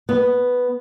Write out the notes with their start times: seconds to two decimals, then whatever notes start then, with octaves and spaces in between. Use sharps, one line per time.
0.09 B3